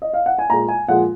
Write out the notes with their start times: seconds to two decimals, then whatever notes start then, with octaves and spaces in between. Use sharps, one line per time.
0.02 D#5
0.13 F5
0.26 F#5
0.39 G#5
0.50 A#2 G#3 A#5
0.68 G#5
0.88 A#2 F3 G#3 F#5